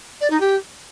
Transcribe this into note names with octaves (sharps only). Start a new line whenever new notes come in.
D5
D#4
G4